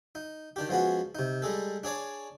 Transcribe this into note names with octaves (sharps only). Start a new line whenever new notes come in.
D#4
D#3 D4 G4
F3 G#3 B3 C#4 F#4
C3 D#4
G3 G#3 G#4 A4
D4 G#4 C#5 D5